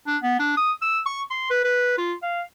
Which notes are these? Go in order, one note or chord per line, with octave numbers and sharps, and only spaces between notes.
D4
B3
D4
D#6
E6
C#6
C6
B4
B4
F4
F5